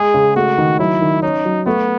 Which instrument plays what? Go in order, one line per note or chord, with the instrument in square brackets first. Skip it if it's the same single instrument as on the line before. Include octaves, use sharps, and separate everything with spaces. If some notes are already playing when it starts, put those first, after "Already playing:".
Already playing: [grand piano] G#3 [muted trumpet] G#4
[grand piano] C#3
[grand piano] A3 [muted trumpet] F#4
[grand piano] D#3
[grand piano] F#3 [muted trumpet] E4
[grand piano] D#3
[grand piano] C#4 [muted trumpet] D#4
[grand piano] F#3
[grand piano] A3 [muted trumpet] B3